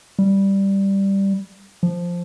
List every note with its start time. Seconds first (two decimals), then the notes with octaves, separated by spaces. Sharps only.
0.19 G3
1.83 F3